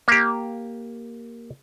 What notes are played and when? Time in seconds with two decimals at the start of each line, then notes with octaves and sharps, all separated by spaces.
0.08 A#3 G4